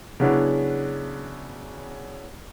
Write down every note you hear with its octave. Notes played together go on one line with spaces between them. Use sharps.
C#3 F#3 B3 C#4 D4 E4